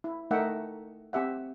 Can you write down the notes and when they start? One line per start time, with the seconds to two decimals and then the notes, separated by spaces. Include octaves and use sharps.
0.04 E4
0.31 A3 D#4 A#4 E5 F#5 G5
1.13 C4 G4 E5 F#5